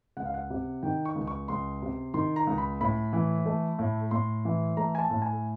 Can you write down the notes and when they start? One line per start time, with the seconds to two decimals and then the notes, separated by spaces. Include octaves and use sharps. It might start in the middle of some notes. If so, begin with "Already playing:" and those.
0.17 C#2 F#5
0.25 F5
0.34 F#5
0.50 C3
0.83 D#3 G5
1.05 C#6
1.15 C#2
1.27 C#6
1.48 C#2 C6
1.82 C3
2.14 D#3 C6
2.36 A#5
2.47 C#2
2.58 B5
2.81 A2 B5
3.13 E3
3.46 A3
3.79 A2
4.11 A2 C6
4.45 E3
4.77 A3 A#5
4.95 G#5
4.99 A5
5.10 A2
5.22 G#5